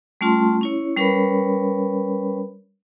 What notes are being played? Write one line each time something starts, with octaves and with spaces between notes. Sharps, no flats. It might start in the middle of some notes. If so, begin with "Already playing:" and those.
G3 A3 C#4 F4 A5 C6
C#4 E4 C#5
G3 C#4 A#4 B4 C#5 B5